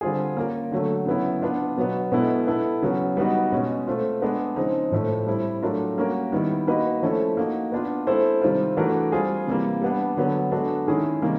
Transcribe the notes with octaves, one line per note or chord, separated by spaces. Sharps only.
D3 G3 C4 F4 G#4
A#3 C#4 F4 A#4
D3 F#3 A3
C#3 F#3 B3 E4
B3 D4 F4
B2 F#3 B3
B2 G#3 B3 E4 A4
B3 E4 A4
C#3 F#3 B3
G3 B3 D#4 F#4
B2 G#3 C#4
A3 C4 F4
G#3 B3 D4
C#3 F3 G#3 C4 D#4
A2 F3 A3
G3 C4 E4
F#3 A3 D4 F4 A#4
G3 A#3 C#4 F#4 A#4
D#3 G3 B3 E4
A#3 D#4 F#4 B4 D#5
F3 A3 C#4 E4 A4
A#3 D#4 F#4
B3 D4 F4
G#3 C4 E4 A4 C5
C3 D#3 G3 C4 F4
E3 A3 D4 F#4 A#4
G3 C4 F4 G#4
C3 E3 G3 A#3
G3 B3 D4
D3 F#3 B3
G#3 B3 D4 F#4 A4
D#3 G#3 C#4 E4 G#4
C3 D#3 G3 A#3